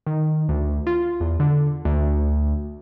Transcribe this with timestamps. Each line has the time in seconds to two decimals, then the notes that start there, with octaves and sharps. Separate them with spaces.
0.07 D#3
0.49 D2
0.87 F4
1.21 E2
1.40 D3
1.85 D2